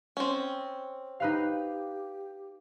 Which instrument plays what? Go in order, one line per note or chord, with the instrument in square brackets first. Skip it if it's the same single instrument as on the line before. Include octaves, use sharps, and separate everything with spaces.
[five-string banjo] C4 C#4
[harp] D#4 B4 F5 [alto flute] G4